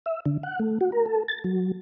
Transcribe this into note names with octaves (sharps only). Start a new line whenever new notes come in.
E5
D3
F#5
A3
F#4
A#4
A4
A6
F#3